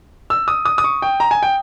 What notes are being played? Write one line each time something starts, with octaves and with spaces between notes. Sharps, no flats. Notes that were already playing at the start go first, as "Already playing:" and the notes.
E6
D#6
D#6
D#6
C#6
G5
A#5
G#5
G5